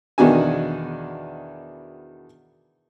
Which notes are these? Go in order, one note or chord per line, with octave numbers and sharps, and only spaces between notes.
E2 B2 D#3 D4 F#4 G#5